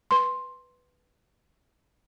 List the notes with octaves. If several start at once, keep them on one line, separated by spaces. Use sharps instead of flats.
B4 C6